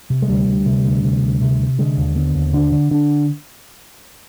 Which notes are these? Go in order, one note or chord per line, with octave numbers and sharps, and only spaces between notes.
C3
G#3
D2 G3
D2
C3
D2
C3
D2
C3
C3
D3 G#3
D#2
D3 B3
D#2
D3 D4
D3
D3 D4